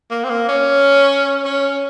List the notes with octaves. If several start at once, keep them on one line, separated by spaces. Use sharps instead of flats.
A#3
C4
A#3
C#4
C#4